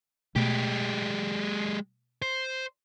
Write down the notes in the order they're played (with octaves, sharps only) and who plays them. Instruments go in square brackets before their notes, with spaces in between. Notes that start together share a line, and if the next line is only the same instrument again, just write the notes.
[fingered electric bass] B2 A3 [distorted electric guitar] G#3 G4
[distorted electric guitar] C5